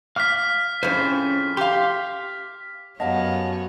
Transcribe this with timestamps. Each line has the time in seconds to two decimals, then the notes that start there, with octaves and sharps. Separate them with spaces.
0.16 F5 D6 F6 F#6 B6
0.83 F2 A2 C#4 G#4 C5
1.57 G4 F5 C6 D6
3.00 F#2 B3 G4 C#5 D#5 F5 F#5 A5